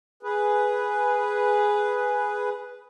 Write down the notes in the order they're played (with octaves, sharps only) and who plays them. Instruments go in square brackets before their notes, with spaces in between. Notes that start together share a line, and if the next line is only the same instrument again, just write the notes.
[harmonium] G#4 B4